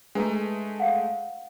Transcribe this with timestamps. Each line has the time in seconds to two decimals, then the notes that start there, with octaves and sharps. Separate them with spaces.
0.15 G#3 A3 D4 B4 A#5
0.80 F5 F#5